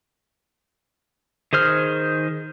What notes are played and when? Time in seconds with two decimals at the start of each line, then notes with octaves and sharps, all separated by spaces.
1.53 D#3 G#4 C5 F6